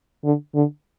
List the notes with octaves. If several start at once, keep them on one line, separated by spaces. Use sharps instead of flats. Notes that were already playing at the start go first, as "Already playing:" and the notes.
D3
D3